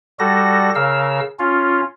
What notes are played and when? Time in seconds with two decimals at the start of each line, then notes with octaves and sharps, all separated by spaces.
0.19 G3 F#4 A4 A#6
0.75 C#3 A#4 F5 E6
1.39 C#4 F4